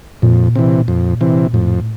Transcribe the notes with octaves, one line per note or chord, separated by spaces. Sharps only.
F2 A#2
C3 E3
F2
C3 E3
F2 A2